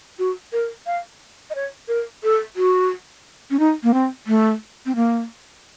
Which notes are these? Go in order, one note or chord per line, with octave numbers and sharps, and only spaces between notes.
F#4
A#4
F5
D#5
C#5
A#4
A4
F#4
C#4
D#4
A#3
C4
A3
C4
A#3